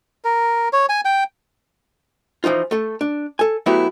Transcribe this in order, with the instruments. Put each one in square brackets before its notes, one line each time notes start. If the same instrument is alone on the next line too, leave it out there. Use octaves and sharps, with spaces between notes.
[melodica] A#4
C#5
G#5
G5
[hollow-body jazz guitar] E3 F3 D#4 F4
A3 A4
D4
A4 G#5
F#3 A3 B3 E4 G4 C#5